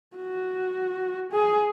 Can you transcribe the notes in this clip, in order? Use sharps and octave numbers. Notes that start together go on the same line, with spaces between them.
F#4
G#4